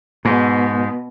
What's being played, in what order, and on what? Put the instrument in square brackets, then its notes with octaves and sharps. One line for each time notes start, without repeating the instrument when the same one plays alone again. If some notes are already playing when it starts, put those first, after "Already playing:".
[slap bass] G#2 [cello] B2